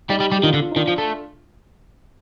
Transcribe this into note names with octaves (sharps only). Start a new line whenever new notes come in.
G3 D#4 G4
G3
G3
G4
D#3 D4 F4
D3
D4 F4
D#4
D#3 D4 F4
F3
A3